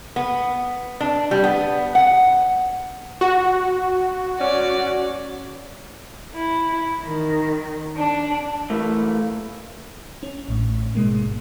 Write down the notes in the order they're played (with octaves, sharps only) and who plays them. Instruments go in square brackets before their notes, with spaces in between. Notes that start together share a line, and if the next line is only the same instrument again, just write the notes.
[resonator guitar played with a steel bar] B3
D4
G3
B3
F#5
[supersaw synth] F#4
[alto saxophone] C#4 [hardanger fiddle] D5
[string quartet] E4
D#3
D4
[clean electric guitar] E3 A3 A#3
[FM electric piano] C#4
A1 A2
G#2 B2 G#3 A#3